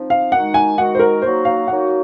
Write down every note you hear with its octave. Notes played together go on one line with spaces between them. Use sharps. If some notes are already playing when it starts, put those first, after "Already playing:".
Already playing: F3 C4 D#4
F5
D#3 G#3 D#4 F#4 F#5
G#5
D#3 G#3 D#4 F#4 F#5
C5
A#4
F#3 A#3 D#4 F#4 C5
F5
F#3 A#3 D#4 F#4 F#5